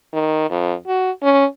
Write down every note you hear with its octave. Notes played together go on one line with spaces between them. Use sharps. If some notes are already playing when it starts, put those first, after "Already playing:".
D#3
F2
F#4
C#4